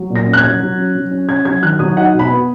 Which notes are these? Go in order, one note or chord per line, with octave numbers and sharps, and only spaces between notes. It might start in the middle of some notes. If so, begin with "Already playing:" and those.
Already playing: F#3
A#2
A#6
C#4
F#6
G#6
F#3
F#3
C#4
F#3
C#4
C#4 G#6
F#3 G#6
D#3 F#6
F#3 D#6
D#4 F#5
B2
B5
B3